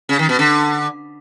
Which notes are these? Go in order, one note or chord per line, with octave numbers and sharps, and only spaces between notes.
C#3
D#3
B2
D3